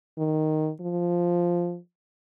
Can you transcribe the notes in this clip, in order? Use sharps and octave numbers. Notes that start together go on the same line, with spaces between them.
D#3
F3